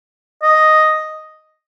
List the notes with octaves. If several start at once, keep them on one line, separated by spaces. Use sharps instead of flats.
D#5